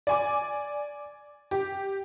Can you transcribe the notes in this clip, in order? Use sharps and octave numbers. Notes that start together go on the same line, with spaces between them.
D5 G#5 D6
G4